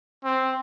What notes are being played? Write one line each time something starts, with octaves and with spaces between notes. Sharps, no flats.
C4